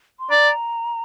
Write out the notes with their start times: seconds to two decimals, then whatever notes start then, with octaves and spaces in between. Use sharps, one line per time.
0.19 C6
0.30 D5 A#5